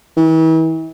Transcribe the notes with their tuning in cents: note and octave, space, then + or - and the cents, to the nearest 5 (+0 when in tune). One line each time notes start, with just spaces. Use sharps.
E3 -40